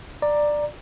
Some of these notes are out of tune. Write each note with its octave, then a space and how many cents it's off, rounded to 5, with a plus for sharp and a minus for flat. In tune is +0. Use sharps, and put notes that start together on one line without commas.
D5 +10 A#5 +0